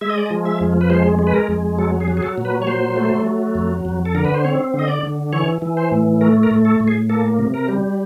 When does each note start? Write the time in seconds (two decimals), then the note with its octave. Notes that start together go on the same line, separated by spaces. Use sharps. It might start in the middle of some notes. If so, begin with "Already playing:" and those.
0.01 G#3 E5
0.10 D#5
0.18 D5
0.26 D#5
0.31 F3
0.45 E5
0.61 F2
0.81 B4
0.90 G#3 C5
1.19 G#3
1.27 B4
1.34 A#4
1.49 F2
1.78 F#3 A4
2.00 G#4
2.08 F#3
2.17 G#4
2.23 A4
2.38 A#2
2.45 B4
2.62 C#5
2.67 F#3 C5
2.96 A3
3.26 F#3
3.55 F2
3.85 F2
4.05 A4
4.15 D3 A#4
4.25 B4
4.34 C5
4.44 C4 C#5
4.74 D3
4.79 D#5
4.88 D5
5.03 D3
5.33 E3 C#5
5.62 E3
5.77 C5
5.92 A2
6.21 A3 A#4
6.43 A#4
6.51 A2
6.65 A4
6.80 A2
6.88 G#4
7.09 A#3 A4
7.39 C3
7.54 A#4
7.69 G3